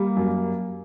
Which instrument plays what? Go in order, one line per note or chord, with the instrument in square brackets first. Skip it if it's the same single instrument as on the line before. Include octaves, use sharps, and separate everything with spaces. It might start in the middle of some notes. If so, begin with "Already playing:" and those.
Already playing: [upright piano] G3 [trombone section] A#3
[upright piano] F#2